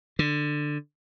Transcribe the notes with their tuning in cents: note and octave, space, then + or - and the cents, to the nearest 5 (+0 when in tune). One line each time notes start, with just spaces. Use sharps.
D3 +15